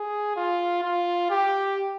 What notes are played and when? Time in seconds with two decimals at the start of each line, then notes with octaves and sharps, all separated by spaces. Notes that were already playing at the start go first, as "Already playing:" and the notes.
Already playing: G#4
0.36 F4
0.83 F4
1.30 G4